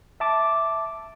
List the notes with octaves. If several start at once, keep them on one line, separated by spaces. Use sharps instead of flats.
E5 A5 D6